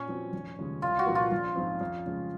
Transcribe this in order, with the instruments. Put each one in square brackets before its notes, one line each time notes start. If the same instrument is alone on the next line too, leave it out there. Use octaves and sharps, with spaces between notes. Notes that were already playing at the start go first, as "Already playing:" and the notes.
Already playing: [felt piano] A#2 [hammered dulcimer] C#4
[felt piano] F3 C4 F#4
F1
D#2 C#3 F3 G#3
[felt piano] C2 [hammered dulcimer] F4
[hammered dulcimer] F#4
[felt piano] A#2 F3 A#3
[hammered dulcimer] F4
[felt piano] A#1
G#2 F3 C4
F2
C#3 F3 G#3